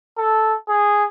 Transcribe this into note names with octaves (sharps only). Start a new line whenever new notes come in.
A4
G#4